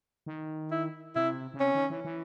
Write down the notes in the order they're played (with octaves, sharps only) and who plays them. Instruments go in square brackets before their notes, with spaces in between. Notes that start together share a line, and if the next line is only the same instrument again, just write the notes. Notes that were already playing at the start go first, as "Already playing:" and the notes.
[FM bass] D#3
[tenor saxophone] E4
[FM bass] C3 [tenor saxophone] E4
[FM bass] C#3
[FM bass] C3 [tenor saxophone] C#4
[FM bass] D#3
E3
E3